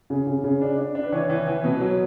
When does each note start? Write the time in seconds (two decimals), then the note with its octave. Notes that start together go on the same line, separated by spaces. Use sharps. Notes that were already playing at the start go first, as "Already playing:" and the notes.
0.10 C#3
0.27 C#3
0.44 C#3
0.61 D4
0.77 D4
0.95 D4
1.03 B4
1.12 E3 C#5
1.29 E3
1.47 E3
1.64 B2 B4
1.80 F#3